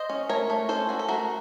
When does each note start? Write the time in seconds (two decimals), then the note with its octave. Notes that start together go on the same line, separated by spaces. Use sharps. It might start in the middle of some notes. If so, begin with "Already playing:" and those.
Already playing: C5 D#5
0.10 C#4
0.29 A3 A#4 C#5
0.50 A3
0.69 C#4 A4 C5
0.89 C#4 F#4
0.99 A4
1.09 A3 F#4 A#4